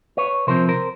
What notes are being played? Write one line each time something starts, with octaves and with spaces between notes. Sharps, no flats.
B4 C#5
C3 F3 A3 C4 A#4 C5
A#4 C5